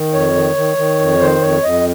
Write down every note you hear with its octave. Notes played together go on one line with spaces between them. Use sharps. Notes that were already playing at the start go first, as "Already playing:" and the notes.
Already playing: D#3
F2 C#5
D#3
D#3
D#3
F2
D#3 C5
F2 C#5
F2 D#5